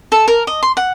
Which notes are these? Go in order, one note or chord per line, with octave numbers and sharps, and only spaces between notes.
A4
A#4
D#5
C6
F#5